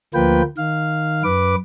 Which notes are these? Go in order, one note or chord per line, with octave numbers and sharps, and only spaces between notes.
D2 F3 A#3 F4 B4 G5
D#3 F5
F#2 B4 D6